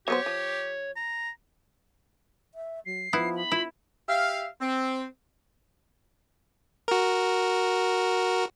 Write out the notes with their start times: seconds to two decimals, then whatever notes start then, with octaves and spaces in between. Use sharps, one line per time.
0.08 F#3 B3 G4 C5 C#5
0.26 F3
0.96 A#5
2.54 E5
2.86 F#3 C7
3.13 F3 B3 E4
3.35 B5
3.52 E4 F4
4.08 G4 E5 F5
4.61 C4
6.88 F#4 A#4